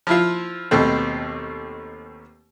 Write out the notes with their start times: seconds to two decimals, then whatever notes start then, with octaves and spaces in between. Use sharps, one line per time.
0.07 F3 E4 F4
0.71 D#2 B2 A3 C4